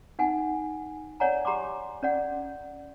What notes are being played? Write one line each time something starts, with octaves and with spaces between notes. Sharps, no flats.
D#4 F#5 G#5
C#5 D5 F#5 G#5 A#5
G4 A#5 C6 D6
C#4 D5 F#5